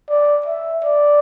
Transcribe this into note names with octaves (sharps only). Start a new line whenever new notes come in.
D5
E5
D5